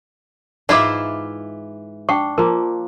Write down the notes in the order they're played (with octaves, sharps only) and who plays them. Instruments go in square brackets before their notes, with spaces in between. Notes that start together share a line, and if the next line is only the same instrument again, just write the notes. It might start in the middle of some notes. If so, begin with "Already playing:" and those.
[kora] G#2 E5 [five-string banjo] E3 E4 F4 [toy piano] F#5 D6
[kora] D4 [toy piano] F#5 G5 C#6
[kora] F3 A#3 [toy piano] A#4